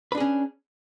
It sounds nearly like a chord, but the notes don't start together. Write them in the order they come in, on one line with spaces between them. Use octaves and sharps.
B4 D4 G#4 C#4